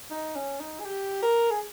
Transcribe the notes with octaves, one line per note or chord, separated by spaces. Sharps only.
D#4
C#4
D#4
G#4
G4
A#4
G#4